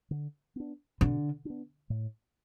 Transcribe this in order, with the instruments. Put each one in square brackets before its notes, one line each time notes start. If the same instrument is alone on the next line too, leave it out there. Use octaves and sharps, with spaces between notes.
[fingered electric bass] D3
B3 D4
[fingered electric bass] B2 [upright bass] D3
[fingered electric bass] B3 D4
A2